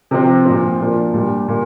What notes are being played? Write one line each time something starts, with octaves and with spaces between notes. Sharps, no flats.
C3 F3 C4
A#2 F3 C4
A#2 F3 A#3 D4
A#2 G3 D4
A#2 A#3